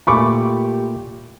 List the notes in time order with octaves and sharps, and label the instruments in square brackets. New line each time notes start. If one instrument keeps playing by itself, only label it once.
[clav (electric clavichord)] A#2 A3 F4 [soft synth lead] G4 [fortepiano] B5 C#6 D6